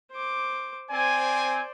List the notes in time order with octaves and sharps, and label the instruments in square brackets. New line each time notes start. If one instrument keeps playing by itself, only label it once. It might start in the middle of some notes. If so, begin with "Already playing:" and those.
[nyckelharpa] C5 D6
[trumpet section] C4 G#5 [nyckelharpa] C5 D5